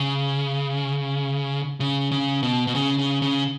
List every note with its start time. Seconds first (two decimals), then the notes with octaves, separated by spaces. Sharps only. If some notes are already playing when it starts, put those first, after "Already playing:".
Already playing: C#3
1.80 C#3
2.11 C#3
2.43 B2
2.67 B2
2.75 C#3
2.98 C#3
3.22 C#3